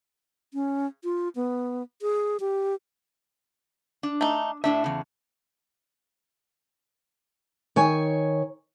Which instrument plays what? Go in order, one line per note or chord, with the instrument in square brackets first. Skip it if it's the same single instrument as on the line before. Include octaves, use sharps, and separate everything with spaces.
[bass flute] C#4
F4
B3
G#4
G4
[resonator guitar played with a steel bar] D4
[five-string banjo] A3 D#4
[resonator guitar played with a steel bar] A2 D4 E5 [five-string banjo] A3
[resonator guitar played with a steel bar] E2 C#3
[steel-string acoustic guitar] D#3 C#5 G#5